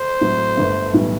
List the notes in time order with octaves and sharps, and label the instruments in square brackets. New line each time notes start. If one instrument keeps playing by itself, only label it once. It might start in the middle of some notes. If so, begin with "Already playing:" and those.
Already playing: [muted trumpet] C5
[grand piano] A2 F#3 C4
G1 G2 D3 A3 D4
B1 A2 E3 G3 B3